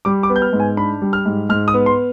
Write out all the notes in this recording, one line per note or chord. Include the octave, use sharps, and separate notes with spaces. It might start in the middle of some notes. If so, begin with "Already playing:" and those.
G3 D6
D6
B3
G6
F6
G#2
G#5
D4 B5
G3
F6
G#2
G#2 F6
D#6
B3
C6